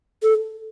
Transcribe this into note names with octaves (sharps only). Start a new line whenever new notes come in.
A4